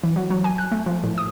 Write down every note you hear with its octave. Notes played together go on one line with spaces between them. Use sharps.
E3
F#3
F#3
G#5
F#6
A3
F3
A2
D#6